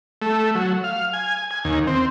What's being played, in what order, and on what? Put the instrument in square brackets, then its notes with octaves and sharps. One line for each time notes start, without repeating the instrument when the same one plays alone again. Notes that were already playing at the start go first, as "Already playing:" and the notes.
[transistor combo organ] A3
F#3
F5
G#5
G#5
D#2
C4